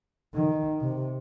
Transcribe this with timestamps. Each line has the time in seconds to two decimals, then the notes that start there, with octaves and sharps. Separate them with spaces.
0.34 D#3
0.81 C3